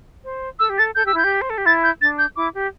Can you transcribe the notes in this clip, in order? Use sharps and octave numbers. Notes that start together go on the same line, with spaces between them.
C5
A4 E6
G4
A4 A6
A4 G6
G4 E6
E4 G6
G4
C5
A4
G4
E4 A6
G6
D4 A6
G6
E4 D6
G4